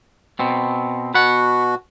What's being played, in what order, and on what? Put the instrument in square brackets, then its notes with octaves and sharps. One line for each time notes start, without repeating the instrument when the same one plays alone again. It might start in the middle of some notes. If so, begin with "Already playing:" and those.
[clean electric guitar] B2 C4
[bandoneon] B2 F#4 [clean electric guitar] B4 F#5